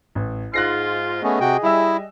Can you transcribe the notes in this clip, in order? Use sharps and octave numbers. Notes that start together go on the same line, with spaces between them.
A1
G#2 F4 F#6 A#6 C7
A3 B3 C#4 G#4 D#5
C3 F#4 G5
G3 E4 E5 E6